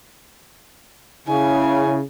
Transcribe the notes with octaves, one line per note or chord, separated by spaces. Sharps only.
C#3 E4 G#5